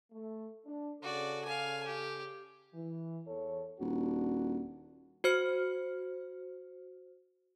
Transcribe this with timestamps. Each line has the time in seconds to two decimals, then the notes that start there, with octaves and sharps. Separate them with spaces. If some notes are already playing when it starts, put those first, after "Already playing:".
0.12 A3
0.66 D4
1.03 C#3 F#4 A4 D5
1.45 F5 G#5
1.87 G4
2.74 E3
3.27 E2 A4 C#5
3.80 D#1 D4 F#4
5.24 F#4 C5 F6 C#7